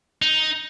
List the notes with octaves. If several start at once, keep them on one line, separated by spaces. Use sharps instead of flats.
D#4